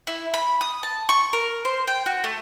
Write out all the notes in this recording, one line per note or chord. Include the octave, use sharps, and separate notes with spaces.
E4
B5
D#6
A5
C#6
A#4
C5
G5
F#4
A3